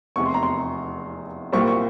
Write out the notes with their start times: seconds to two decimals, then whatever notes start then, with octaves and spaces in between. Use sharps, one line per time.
0.16 F1 E2 C3 C#6
0.26 C6
0.34 A#5
0.43 C6
1.52 C2 A#2 G3 C4 C#6
1.68 C#6